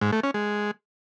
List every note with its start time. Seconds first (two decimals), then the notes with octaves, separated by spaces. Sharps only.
0.01 G#2
0.12 A3
0.23 C#4
0.34 G#3